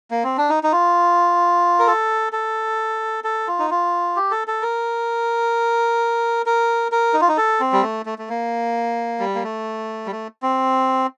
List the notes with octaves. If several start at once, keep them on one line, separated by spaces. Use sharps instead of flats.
A#3
C4
D4
D#4
D#4
F4
A#4
A4
A4
A4
F4
D#4
F4
G4
A4
A4
A#4
A#4
A#4
D#4
F4
D#4
A4
C4
G3
A3
A3
A3
A#3
G3
A#3
A3
G3
A3
C4